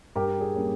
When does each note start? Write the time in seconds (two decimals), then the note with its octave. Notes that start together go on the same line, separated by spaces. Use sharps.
0.15 G2 G4 A#4
0.41 G#4
0.54 G3 A#3 C#4